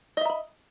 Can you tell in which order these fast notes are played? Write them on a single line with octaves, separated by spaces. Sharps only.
D#5 E5 A#5 B5